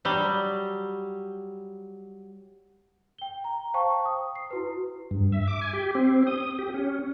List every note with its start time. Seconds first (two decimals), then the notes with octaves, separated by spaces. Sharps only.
0.05 F#3 G3
3.18 G5 G7
3.44 A#5
3.74 C5 F5 G5 A5 C#6
4.05 D#6
4.36 C7
4.51 E4 F#4 B4
5.11 G2
5.32 E5
5.48 D6
5.61 G#5
5.73 G4
5.95 C4
6.27 D#6
6.59 G4
6.74 C#4